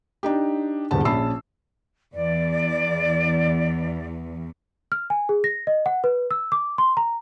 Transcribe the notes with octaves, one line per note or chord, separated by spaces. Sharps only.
D4 D#4 G4
D#1 E2 G2 D3 A5
A#1 C#4 A5 B5 E6 C7
E2 D5
F6
G#5
G#4
A#6
D#5
F#5
B4
E6
D6
C6
A#5